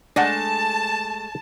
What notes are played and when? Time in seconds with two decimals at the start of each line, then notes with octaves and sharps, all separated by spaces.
0.16 G#3 A3 D4 F#5 A5